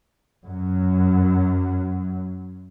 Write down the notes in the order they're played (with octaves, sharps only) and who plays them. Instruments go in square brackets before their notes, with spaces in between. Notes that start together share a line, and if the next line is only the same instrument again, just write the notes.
[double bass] F#2 F#3